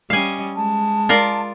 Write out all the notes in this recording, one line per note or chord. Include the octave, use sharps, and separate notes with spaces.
G3 C#4 D#5 F5 G#5
G#3 A5
F4 A#4 D5